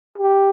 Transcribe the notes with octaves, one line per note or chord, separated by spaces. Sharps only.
G4